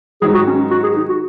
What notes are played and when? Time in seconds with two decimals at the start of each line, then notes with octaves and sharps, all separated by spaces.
0.22 G#2 D#3 F#3 G#4
0.34 F#4
0.47 C#4
0.71 F#4
0.84 G#4
0.97 D#4
1.09 F#4